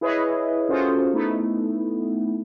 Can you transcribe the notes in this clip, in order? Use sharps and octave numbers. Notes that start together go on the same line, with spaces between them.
E4 G#4 B4 C#5 D#5 E5
C#4 F4 F#4 G#4 A4 C5
A3 B3 D#4 E4